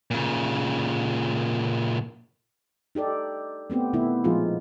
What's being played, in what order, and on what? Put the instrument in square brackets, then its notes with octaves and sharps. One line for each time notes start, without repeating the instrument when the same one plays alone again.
[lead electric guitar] A#2 C#3
[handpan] D#4 G4 A4 D5
A3 B3 C4 G4
B2 D#3 A3 B3 E4
A#2 F3 G#3 D#4 F4 G#4